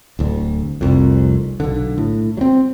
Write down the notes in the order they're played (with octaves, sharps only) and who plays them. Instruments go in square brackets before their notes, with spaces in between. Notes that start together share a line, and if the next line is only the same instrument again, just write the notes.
[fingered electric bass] D1 D2
F1 C2 F2
B1 D3
A2
F#3 C4